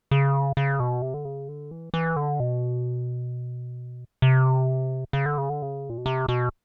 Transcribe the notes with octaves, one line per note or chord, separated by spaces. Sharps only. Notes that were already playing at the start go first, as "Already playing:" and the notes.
C#3
C#3
B2
C3
D3
C#3
D3
E3
E3
D3
B2
C3
C#3
D3
C#3
D3
C#3
A#2
B2
C3
B2